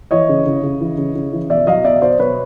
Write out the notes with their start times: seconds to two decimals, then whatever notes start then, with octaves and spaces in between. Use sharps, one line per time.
0.11 E3 C#5 D#5
0.29 C#3
0.46 C#3
0.63 C#3
0.81 E3
0.98 C#3
1.15 C#3
1.33 E3
1.50 B2 D5 E5
1.67 F#3 D#5 F5
1.85 B2 D5 E5
2.02 B2 C5 D5
2.19 B2 B4 C#5